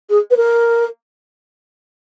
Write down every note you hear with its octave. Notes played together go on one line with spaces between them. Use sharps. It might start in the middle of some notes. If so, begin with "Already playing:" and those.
G#4
B4
A#4